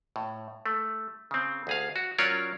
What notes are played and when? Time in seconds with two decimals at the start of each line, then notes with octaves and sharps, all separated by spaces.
0.16 A2
0.66 A3
1.31 C#3 C4
1.67 D2 G#4 F5
1.96 F#4
2.18 F#3 C#4 F4 A#4 C#5 D5